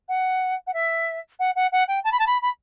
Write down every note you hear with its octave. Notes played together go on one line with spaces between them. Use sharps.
F#5
F#5
E5
F#5
F#5
F#5
G5
A5
B5
A5
B5
B5